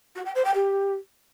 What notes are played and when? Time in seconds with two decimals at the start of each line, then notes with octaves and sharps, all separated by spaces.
0.15 F#4
0.25 G5
0.35 C5
0.44 G5
0.54 G4